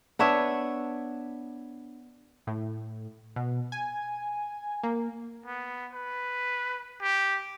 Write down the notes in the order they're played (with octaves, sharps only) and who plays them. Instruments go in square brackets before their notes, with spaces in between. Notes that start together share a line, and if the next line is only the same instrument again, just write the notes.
[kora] B3 D4 C#5 E5
[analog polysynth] A2
B2
G#5
A#3
[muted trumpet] B3
B4
G4